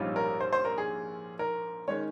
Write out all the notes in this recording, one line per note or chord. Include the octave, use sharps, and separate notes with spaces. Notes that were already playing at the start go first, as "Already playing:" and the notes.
Already playing: A#1 G#2 G3 C#4 F4
A#4
C5
C5
A#4
G#4
A#4
D#3 G#3 C#4 C#5